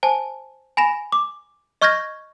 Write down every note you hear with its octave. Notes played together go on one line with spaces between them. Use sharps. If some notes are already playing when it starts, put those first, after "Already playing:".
C5 G#5 A5
G#5 B5 A#6 E7
D6
D#5 C#6 F6 G6 G#6 A#6